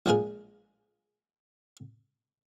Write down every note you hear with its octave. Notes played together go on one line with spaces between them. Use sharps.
A#1 F3 G#3 G#4 A#4